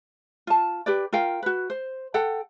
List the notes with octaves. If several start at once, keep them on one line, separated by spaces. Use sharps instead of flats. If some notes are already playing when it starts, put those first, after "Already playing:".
F4 A5
G4 B4 D5
F4 A#4 F5 G5
F#4 B4
C5
A4 F#5 G5